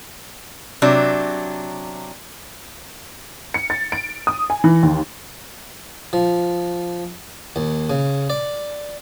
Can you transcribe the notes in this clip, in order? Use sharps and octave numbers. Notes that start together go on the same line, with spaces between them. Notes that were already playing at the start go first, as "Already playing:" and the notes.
C3 F#3 D4
C#7
A6
D7
D#6
G#5
E3
D#2
F3
D#2
C#3
D5